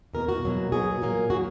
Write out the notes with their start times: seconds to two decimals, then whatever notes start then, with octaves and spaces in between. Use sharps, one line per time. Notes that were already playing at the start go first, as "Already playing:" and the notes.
0.13 E2 B2 A#3 A#4
0.28 F#4
0.43 B2 F#3 A#3
0.72 B2 F#3 A#3 G#4
1.02 A#2 F#3 A#3
1.30 A#2 F#3 A#3 F#4